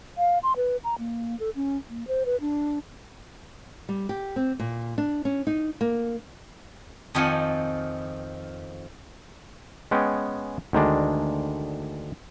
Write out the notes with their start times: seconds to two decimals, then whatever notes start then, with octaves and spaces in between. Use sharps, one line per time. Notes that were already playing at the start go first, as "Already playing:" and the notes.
0.18 F5
0.43 C6
0.57 B4
0.84 A#5
0.99 A#3
1.40 A4
1.56 C#4
1.89 A#3
2.08 C5
2.26 B4
2.41 D4
3.89 G3
4.09 G4
4.36 C4
4.59 A#2
4.98 D4
5.25 C#4
5.47 D#4
5.81 A#3
7.15 F2 D#3 F3 F#5 G#5
9.91 G#3 B3 C#4 G5 G#5
10.73 D2 D#3 G#3 D4